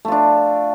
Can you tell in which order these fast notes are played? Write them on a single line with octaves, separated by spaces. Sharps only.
A3 F4 D4